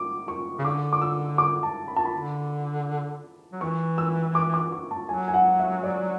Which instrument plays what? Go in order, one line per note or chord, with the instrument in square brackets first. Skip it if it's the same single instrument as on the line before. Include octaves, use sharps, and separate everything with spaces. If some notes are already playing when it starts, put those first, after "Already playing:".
Already playing: [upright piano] D6
C#6
[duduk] C#3
[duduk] D3 [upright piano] D6
[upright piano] D6
E6
D6
A5
B5
A5
B5
[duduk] D3
F#3
[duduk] E3 [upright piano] C#6
[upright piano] E6
D6
D6
C#6
A5
[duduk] F#3 [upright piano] G#5
[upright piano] G#5
F#5
E5
D5